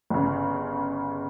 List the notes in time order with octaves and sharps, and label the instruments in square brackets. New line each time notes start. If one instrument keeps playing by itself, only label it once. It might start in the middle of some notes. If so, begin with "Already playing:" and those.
[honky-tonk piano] G1 C#3